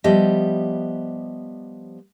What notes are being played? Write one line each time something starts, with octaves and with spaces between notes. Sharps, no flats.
F3 G3 B3 G4 D#5 E5